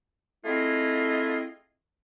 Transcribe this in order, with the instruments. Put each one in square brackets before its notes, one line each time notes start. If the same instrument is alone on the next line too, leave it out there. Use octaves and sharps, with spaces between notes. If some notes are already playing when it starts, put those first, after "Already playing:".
[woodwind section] A3 C4 E4 F4 G#4 D#5